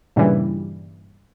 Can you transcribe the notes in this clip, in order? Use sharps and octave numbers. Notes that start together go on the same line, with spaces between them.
G2 A#2 C#3 E3 G3